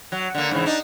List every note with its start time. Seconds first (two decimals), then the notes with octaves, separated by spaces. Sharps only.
0.12 F#3
0.35 D3 A#3
0.51 G#2 C#3 E3
0.66 D4 D#4